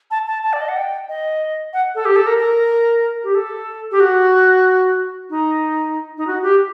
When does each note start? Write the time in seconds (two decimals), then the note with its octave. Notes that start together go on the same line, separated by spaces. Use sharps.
0.11 A5
0.27 A5
0.43 A5
0.53 D5
0.61 D#5
0.68 F#5
0.76 G5
1.09 D#5
1.73 F#5
1.95 A4
2.05 G4
2.16 A4
2.27 A#4
2.38 A#4
3.24 G4
3.35 A4
3.91 G4
4.00 F#4
5.30 D#4
6.18 D#4
6.27 F#4
6.43 G4